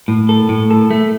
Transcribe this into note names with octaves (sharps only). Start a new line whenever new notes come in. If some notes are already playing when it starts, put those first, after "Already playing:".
A2
A4
A2
A4
A3